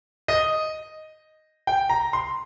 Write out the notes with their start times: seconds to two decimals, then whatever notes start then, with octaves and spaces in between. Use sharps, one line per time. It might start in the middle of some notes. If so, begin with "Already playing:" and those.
0.28 D#5
1.67 G5
1.90 A#5
2.13 C6